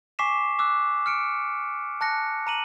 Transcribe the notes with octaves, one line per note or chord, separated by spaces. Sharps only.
G#5 C#6 D6 B6 C7 E7
D6 E6 F#6
F6 C#7 D7
A5 F#6 A#6 C#7
A#5 D#7 F#7